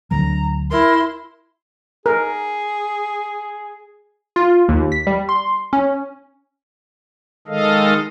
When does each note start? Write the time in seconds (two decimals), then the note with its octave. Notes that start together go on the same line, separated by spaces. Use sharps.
0.11 D2 D3 F#3 A#5
0.71 E4 A#4 C6
2.06 G#4 A#4
4.36 F4
4.69 D#2
4.92 B6
5.07 G3
5.29 C6
5.73 C#4
7.48 D#3 G#3 A4 D#5 F5